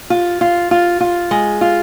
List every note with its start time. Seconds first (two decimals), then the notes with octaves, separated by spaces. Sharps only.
0.10 F4
0.41 F4
0.71 F4
1.01 F4
1.31 G#3
1.61 F4